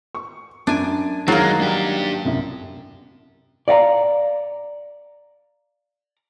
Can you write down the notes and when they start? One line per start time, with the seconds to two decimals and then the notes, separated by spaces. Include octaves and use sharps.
0.15 C#6
0.67 F#2 D4 G#5 D7
1.28 D#3 F#3 G#3 A#3 A6 C7
1.61 D4 G4
2.25 C2 F#2
3.68 D5 F5 F#5 A#5